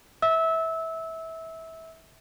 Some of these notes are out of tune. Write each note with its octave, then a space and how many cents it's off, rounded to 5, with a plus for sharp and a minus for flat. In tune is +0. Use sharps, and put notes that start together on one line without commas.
E5 -20 E6 -20